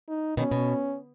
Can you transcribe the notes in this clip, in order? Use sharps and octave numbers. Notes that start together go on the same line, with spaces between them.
D#4
B2 D#3 C#4
B2